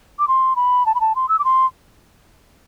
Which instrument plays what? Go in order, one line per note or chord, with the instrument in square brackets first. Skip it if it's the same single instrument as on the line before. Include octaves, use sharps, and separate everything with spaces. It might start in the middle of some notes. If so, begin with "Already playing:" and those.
[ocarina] D6
C6
B5
A5
B5
A5
C6
E6
D6
C6